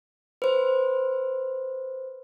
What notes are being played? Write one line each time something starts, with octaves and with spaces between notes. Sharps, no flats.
B4 C5